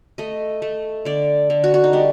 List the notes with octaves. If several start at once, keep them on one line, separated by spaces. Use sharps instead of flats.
A3 D#5
A3
D3 D5
D3
F#4
F#4
D#4
G3 D4